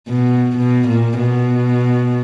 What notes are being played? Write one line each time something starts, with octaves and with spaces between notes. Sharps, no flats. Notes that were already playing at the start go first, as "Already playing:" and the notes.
B2
B2
A#2
B2